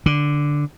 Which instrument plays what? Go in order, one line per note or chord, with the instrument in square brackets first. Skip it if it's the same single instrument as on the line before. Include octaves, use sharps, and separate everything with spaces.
[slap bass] D3